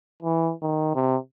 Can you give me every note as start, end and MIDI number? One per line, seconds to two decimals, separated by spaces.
0.23 0.52 52
0.62 0.92 51
0.95 1.17 48